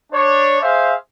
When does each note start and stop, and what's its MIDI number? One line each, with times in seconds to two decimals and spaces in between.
0.13 0.62 62
0.13 0.62 73
0.62 0.94 68
0.62 0.94 72
0.62 0.94 76
0.62 0.94 77